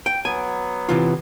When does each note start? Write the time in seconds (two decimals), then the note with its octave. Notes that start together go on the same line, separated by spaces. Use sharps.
0.06 G5
0.25 F#3 B3 G#5
0.89 C3 E3 F4